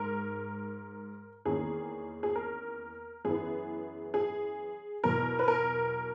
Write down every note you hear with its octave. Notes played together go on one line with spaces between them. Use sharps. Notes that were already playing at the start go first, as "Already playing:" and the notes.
Already playing: G#2 A#4
E2 D#3 A#3 C#4 G#4
G#4
A#4
F#2 E3 B3 G#4
G#4
E2 B2 F#3 B3 A#4
B4
A#4